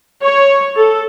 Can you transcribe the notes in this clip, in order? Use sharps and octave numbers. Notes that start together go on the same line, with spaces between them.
C#5
A4